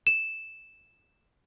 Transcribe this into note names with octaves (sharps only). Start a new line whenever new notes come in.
E7